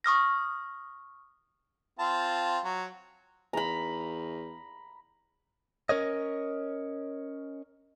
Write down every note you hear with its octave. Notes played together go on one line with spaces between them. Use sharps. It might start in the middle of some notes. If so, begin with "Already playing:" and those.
C#6 D#6 F6 A#6
C4 F4 A5
F#3
E2 A#5 B5
C#4 A#4 C#5 D#5